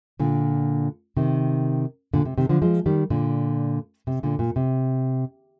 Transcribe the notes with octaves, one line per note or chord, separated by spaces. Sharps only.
A#2 D3
C3 D#3
A#2 D3
C3
C3 D#3
D3 F3
F3 G#3
D#3 G3
A#2 D3
C3
A#2 D3
A#2
C3